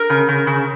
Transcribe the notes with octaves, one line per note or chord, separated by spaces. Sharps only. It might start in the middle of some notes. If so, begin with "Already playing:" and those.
Already playing: A#4
C#3
C#3
C#3